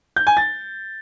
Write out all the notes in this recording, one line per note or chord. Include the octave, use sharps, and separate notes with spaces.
G6
G#5
A6